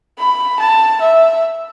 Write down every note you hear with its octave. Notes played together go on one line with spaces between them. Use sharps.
B5
A5
E5